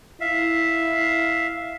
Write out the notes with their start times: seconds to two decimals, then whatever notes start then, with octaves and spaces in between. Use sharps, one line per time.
0.21 E4 E5 F5